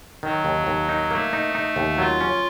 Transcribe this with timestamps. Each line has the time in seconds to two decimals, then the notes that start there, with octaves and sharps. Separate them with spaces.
0.23 D#3 F#3
0.45 D#2
0.67 D#2
0.89 D#4
1.11 A3 A#3
1.33 D#4
1.55 D#4
1.76 D#2
1.98 F#3 F4
2.21 C#4